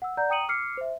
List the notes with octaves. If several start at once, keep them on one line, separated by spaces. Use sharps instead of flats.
F#5 E6
D5 F#5 A#5 G6
G5 A#5 D#6 C#7 D#7 F#7
D6 E6 F6 C7 C#7
C5 E5